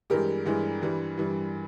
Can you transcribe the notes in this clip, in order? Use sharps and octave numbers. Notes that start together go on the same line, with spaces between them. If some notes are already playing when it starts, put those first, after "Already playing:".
G2 E3 G#3 G4 A#4
G2 E3 G#3
G2 E3 G3
G2 E3 G3